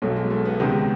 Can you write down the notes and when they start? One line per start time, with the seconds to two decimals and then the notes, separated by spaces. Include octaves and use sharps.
0.02 B1 B2 F#3 A3
0.16 G#3
0.30 A3
0.45 B3
0.60 C#2 C3 D#3 G#3